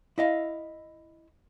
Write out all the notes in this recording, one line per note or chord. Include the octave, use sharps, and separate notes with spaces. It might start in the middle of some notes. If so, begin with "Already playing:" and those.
E4 D#5 F5